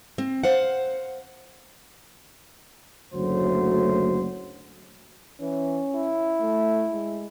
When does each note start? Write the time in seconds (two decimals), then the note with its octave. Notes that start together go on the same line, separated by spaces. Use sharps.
0.18 C4
0.44 C5 F5 F#5
3.14 F#1 D2 F#3 A3 C5
5.41 E3 C#4
5.96 E4
6.41 A3
6.92 G#3